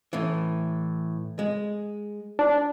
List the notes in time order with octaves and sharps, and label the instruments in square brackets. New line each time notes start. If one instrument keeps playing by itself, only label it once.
[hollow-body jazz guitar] A2 E3
G#3
[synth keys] D4